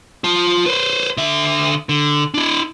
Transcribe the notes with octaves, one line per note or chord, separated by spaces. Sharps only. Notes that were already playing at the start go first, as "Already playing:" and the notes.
F4 A5
B4 C5
D3 E5
D3
D4 E4